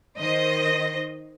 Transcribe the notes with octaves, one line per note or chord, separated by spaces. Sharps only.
D#3 C5 D#5